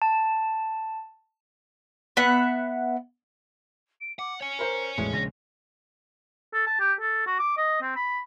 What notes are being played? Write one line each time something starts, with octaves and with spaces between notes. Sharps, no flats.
A5
B3 E5 F#5
D7
F#5 D6
C#5 G#5 C#7
A#4 C5
G#1 E2 A2 G#3
A#1 C#3 A#6
A4
A5
G4
A4
F#4
D6
D#5
C4
B5